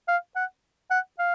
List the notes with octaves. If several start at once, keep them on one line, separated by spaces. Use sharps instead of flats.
F5
F#5
F#5
F5